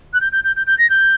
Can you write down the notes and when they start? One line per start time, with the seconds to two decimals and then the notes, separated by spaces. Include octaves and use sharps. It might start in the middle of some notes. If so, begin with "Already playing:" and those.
0.13 F#6
0.21 G6
0.32 G6
0.44 G6
0.56 G6
0.66 G6
0.78 A#6
0.90 G6